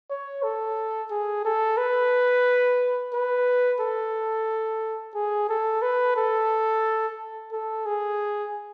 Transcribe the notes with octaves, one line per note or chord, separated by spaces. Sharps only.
C#5
A4
G#4
A4
B4
B4
A4
G#4
A4
B4
A4
A4
G#4